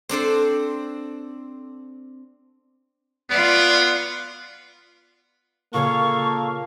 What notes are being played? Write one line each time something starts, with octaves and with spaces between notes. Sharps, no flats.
C4 D4 A4 C5
B3 F4 D5
A#2 C#3 A#3 A4 C#5 F5 C#6